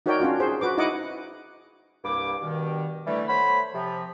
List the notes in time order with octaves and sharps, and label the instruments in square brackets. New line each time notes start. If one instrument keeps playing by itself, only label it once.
[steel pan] D#4 F#4 A#4 C#5 D5 G5
C#4 D4 F4 F#4
G#4 C5
F#4 B4 D6
D#4 E4 D#5 F#5 D6
[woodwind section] C2 G2 A#3 B5 D6
G2 B2 D#3
D3 E3 G3 A3
A3 C5 C#5 F#5 B5
C3 F3